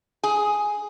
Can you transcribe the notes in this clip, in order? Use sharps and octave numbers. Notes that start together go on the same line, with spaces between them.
G#4